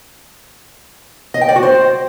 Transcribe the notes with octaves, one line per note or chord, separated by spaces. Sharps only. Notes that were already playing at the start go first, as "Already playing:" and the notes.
D#5
G5
D5
F#4
C5